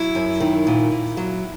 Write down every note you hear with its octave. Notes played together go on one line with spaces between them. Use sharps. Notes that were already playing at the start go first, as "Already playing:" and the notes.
Already playing: F#3 E4
F#2
D#3
A#2
A#2
F#3